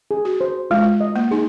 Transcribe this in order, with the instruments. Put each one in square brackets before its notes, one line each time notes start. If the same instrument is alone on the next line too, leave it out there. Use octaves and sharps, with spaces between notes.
[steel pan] G#4
[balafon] F#4
[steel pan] C5
[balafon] G#3 [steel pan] F4
[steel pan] D#5
[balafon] A#3
[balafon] D#4 [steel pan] G#4